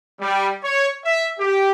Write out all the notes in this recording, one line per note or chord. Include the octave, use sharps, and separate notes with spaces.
G3
C#5
E5
G4